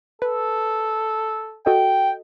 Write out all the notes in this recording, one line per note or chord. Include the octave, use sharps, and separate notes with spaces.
A4 B4
F#4 A4 D#5 G5